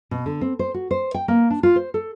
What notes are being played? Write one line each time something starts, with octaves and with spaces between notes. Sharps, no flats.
B2
D3
C4
C5
F#4
C5
G5
A#3
D4
F4
C5
A4